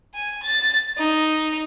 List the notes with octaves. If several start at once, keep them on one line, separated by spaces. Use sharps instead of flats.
G#5
A6
D#4